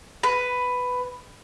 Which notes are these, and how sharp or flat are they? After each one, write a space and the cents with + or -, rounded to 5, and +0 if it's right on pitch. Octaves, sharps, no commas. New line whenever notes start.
B4 +10